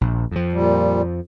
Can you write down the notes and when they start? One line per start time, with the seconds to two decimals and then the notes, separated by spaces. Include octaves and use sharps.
0.01 A#1
0.31 F2 F3
0.53 A#2 G3